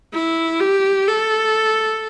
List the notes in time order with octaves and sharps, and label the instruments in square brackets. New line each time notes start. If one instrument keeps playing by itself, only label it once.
[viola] E4
G4
A4